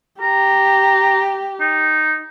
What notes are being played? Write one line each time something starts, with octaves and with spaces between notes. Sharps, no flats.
G4 A#5
D#4